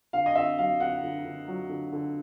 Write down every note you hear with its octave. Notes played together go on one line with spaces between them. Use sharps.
D3 F5
D#5
D3 E5
F#3 F5
D3 F#5
D3
D3
F#3
D3
D3